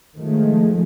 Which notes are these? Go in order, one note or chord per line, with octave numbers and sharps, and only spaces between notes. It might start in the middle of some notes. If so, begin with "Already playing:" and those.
D#3 F3 G#3 A3